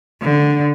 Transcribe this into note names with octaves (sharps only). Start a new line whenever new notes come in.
D3